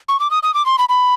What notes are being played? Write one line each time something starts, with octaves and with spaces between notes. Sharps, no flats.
C#6
D6
D#6
D#6
D6
C6
B5
B5